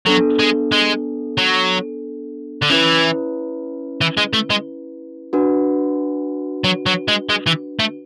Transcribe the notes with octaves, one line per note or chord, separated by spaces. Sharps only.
F#3 B3 D4 A4
G#3
G#3
F#3
D3
E3 C#4 E4 B4
E3
G#3
A3
G#3
D4 F#4 B4
F#3
F#3
G#3
G#3
E3
A3